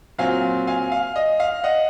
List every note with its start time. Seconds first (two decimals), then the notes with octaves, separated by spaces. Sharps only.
0.18 A#2 F#3 C4 F4 F5 G#5
0.67 F5 G#5
0.92 F5
1.16 D#5
1.40 F5
1.64 D#5 F#5